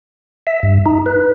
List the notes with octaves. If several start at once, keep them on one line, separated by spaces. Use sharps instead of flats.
E5
G2
D#4
B4